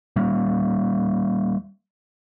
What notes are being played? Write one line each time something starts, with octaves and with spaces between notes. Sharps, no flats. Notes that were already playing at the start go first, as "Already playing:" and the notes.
G3 A#3 C#4